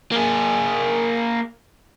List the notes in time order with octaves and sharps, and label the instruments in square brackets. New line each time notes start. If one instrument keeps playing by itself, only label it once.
[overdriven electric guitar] A#3 G#4